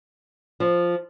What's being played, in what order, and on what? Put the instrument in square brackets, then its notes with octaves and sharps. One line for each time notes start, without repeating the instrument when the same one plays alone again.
[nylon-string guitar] F3